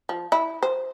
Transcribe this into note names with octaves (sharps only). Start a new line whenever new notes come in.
F3
E4
C5